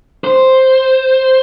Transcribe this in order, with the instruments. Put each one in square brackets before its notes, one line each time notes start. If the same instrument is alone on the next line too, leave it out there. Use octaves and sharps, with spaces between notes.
[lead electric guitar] C5